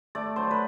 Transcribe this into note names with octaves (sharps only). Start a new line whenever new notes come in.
A3 D5
F#3 C5
B4